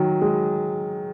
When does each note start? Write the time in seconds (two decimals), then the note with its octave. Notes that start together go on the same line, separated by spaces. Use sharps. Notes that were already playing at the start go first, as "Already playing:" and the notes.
Already playing: D#3 F#3
0.21 G#3